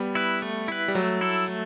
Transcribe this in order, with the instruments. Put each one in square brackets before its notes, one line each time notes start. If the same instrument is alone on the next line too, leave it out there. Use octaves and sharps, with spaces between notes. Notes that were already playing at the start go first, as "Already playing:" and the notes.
Already playing: [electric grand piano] G3 B3
[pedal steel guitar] E4 B4
A3
E4 B4
[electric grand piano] G3
[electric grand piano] F#3 [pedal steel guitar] A3
[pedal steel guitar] E4 A4
A3